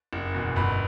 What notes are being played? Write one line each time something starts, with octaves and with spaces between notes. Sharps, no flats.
F#1
E2 B2
G1 B5